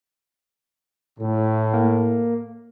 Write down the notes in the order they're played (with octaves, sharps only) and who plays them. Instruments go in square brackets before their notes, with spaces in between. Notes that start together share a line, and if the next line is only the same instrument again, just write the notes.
[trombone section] A2
[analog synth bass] A#3